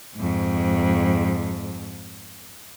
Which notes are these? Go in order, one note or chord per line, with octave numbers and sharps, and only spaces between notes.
F2 G#2